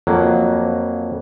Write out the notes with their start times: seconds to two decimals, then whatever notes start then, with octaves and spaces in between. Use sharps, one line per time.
0.07 F2 F#3 A#3